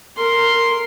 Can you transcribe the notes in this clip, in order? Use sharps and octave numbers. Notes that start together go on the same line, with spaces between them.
A#4 C6